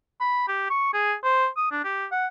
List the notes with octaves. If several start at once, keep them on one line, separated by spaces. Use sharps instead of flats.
B5
G4
C#6
G#4
C5
D#6
D4
G4
F#5